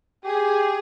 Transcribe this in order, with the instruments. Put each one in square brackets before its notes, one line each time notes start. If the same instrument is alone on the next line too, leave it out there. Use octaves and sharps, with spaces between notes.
[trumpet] G4 [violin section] G#4